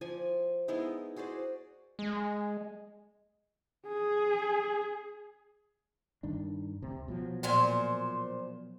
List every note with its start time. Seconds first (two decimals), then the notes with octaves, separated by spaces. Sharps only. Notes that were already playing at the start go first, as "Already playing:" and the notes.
0.01 F3 D5 G#5
0.68 G#3 B3 D#4 E4
1.16 F#4 G#4 C5 D5
1.99 G#3
3.87 G#4
6.23 G2 D#3 D4
6.82 D2 C3
7.08 B2 F3 F#3
7.43 A#2 C5 G#5